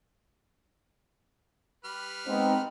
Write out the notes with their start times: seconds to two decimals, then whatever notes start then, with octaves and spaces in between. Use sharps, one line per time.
1.85 G3 B4 F6
2.27 G#3 B3 C4 D#4